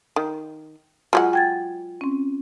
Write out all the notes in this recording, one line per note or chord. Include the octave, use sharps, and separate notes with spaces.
D#3
F#3 G#3 F4 F#5
G5 G#6 A6
C4 C#4